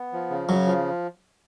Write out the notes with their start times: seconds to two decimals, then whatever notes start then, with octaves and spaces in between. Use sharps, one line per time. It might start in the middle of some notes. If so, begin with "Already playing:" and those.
Already playing: B3
0.13 F3
0.30 C#3
0.49 F#2 C#3 F#3
0.66 F3